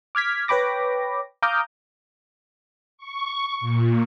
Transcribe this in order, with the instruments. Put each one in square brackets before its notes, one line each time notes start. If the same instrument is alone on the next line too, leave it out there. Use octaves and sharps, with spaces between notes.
[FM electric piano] D6 F6 G#6 B6
B4 C#5 G5 B5 D6 A#6
F5 A#5 D6 D#6 F6 G6
[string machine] C#6
A#2